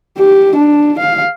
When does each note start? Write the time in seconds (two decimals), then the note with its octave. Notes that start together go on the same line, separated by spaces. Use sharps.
0.19 G4
0.56 D4
0.99 F5